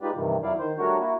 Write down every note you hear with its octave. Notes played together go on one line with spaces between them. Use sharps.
G#3 D#4 F4 G4 B4 D5
G2 C3 D#3 E3 G3
F2 F#3 E4 D5 F5
D#3 C5
G3 A3 D4 F#4 A#4 C#5
A#3 E4 F#4